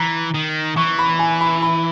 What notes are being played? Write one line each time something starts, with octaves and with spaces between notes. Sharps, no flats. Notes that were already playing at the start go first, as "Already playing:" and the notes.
Already playing: E3 A#5
D#3
E3 C#6
B5
G#5
B5
B5